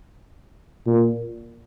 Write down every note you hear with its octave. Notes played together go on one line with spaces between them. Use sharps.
A#2